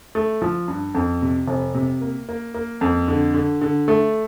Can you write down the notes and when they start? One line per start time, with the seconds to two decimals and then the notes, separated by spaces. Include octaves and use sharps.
0.15 A3
0.42 F3
0.68 G2
0.95 F2
1.22 C3
1.48 F1
1.74 C3
2.01 A#3
2.29 A#3
2.54 A#3
2.81 F2
3.08 D3
3.34 D3
3.61 D3
3.88 A3